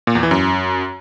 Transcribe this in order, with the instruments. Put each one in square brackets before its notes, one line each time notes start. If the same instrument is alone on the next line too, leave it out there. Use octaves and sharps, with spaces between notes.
[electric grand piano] A#2
E2
E3
F#2